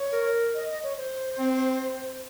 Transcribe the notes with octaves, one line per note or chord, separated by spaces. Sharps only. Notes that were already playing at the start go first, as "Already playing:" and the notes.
Already playing: C#5
A#4
D#5
D#5
C#5
C5
C4